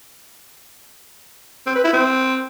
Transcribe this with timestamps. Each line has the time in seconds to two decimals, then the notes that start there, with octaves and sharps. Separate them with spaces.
1.67 C4
1.75 B4
1.84 E4
1.93 C4